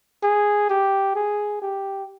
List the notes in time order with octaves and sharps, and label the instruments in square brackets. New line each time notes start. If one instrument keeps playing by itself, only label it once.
[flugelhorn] G#4
G4
G#4
G4